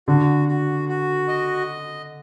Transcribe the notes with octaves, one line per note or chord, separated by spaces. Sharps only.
D3 F#4
F#4
F#4
D#5